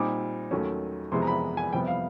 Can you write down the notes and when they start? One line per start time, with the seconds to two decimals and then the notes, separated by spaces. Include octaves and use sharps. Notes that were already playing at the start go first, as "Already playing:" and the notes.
Already playing: A#2 G3 C4 D#4 D6
0.51 D#2 D#3 F#3 A3 C#4
1.12 F2 C3 E3 G#3 B3 C6
1.22 A#5
1.27 B5
1.57 G#5
1.73 F2 C3 E3 G3 B3 G5
1.87 F5